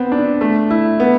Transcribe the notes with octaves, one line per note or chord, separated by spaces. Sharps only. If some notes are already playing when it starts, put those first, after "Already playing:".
Already playing: B3 C4
D4
A3
E4
B3